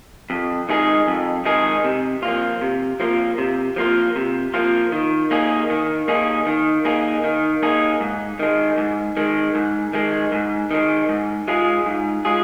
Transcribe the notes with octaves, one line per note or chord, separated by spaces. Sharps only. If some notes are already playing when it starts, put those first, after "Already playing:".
F2
D#3 G#3 D#4 G#4
F2
D#3 G#3 D#4 G#4
C3
F3 A#3 F4
C3
F3 A#3 F4
C3
F3 A#3 F4
C3
F3 A#3 F4
D#3
A#3 D#4 G#4
D#3
A#3 D#4 G#4
D#3
A#3 D#4 G#4
D#3
A#3 D#4 G#4
G#2
D#3 G#3
G#2
D#3 G#3
G#2
D#3 G#3
G#2
D#3 G#3
G#2
G#3 F4 G#4
G#2
G#3 F4 G#4